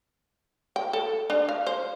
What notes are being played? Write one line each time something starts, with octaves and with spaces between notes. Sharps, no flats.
G5
A4
D4
F5
C5